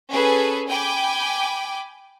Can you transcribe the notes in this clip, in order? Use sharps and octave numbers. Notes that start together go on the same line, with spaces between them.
C#4 G#4 A4 B4
G5 G#5 B5 D6